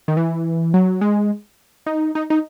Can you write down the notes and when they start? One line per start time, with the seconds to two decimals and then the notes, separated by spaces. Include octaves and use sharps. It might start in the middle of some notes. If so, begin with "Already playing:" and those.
0.08 D#3
0.17 E3
0.74 F#3
1.01 G#3
1.86 D#4
2.15 D#4
2.30 D#4